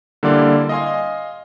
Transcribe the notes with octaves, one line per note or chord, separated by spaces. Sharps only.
D3 G3 A#3 E4 D5 C6
D#5 F5 G#5 C6